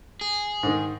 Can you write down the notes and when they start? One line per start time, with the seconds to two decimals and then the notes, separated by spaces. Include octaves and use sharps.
0.21 G#4
0.63 G#2 D#3